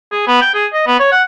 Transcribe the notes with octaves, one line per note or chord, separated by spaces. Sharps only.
G#4
B3
G5
G#4
D#5
B3
C#5
F#5